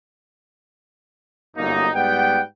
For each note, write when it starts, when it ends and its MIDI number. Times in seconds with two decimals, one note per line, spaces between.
1.57 1.89 31
1.57 1.89 42
1.57 1.89 58
1.57 1.89 63
1.94 2.40 44
1.94 2.40 55
1.94 2.40 59
1.94 2.40 78
1.94 2.40 79